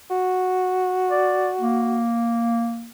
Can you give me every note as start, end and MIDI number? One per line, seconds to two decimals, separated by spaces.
0.11 2.01 66
1.11 1.49 74
1.60 2.89 58